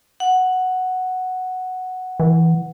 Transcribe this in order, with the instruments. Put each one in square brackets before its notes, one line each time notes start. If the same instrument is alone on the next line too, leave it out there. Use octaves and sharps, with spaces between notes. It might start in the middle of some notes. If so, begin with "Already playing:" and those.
[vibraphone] F#5
[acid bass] E3